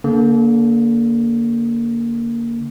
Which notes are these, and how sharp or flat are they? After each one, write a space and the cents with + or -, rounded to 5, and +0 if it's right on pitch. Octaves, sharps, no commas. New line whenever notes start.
D3 -35 A#3 +0